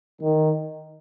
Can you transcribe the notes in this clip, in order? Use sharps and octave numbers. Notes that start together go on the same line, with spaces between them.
D#3